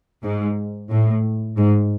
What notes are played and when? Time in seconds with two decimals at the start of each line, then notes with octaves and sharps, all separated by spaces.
0.24 G#2
0.90 A2
1.57 G#2